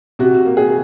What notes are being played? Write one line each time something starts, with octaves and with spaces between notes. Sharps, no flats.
C3 F#4
A#3
G#4